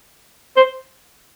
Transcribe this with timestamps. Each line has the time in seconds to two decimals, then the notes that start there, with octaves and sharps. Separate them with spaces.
0.57 C5